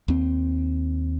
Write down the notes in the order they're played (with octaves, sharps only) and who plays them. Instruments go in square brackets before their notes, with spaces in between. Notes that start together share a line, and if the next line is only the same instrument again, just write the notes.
[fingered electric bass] D#2 C4